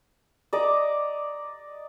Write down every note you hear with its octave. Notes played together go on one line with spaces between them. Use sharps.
D5 D#5 A#5 D6